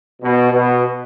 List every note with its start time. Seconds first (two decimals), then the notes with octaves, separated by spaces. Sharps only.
0.22 B2
0.51 B2